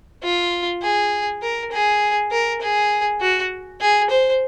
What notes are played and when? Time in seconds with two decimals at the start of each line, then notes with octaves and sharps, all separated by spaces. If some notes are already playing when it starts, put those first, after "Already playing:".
0.23 F4
0.82 G#4
1.42 A#4
1.72 G#4
2.31 A#4
2.61 G#4
3.21 F#4
3.81 G#4
4.10 C5